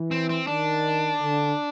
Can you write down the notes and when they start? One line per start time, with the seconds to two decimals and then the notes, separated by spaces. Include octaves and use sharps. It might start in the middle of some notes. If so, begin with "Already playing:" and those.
Already playing: E3
0.11 C4
0.29 C4
0.47 D#3 D4
1.21 D3